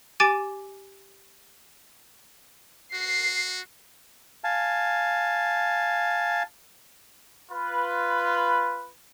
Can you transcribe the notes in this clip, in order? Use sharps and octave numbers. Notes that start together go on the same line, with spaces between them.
G4 G#5 D6 A6 D7 D#7
F#4 C7
F5 G#5 A5
F4 B4